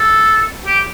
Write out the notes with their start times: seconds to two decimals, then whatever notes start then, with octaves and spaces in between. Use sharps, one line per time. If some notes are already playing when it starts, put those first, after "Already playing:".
Already playing: A4
0.66 G4